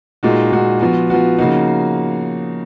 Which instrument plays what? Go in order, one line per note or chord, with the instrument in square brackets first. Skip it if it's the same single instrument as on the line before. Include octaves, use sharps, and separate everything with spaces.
[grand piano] A#2 G#3 D#4 F#4
A#2 G#3 D#4 F#4
F3 B3 F#4
F3 B3 F#4
C#3 F3 A#3 D#4 F#4